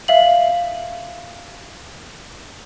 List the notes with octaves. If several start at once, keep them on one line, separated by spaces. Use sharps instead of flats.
E5 F5 F#7